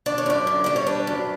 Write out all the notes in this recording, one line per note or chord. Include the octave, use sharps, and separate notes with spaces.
D4 D5
C#5
F#2 D5
D3
G3 D5
C#5
D4 B4
F#2